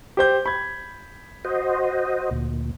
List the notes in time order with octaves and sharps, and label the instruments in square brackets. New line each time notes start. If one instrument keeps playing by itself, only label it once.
[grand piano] G4 C5 G6
B5 G#6
[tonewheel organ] F#4 C5 D#5
D2 A#2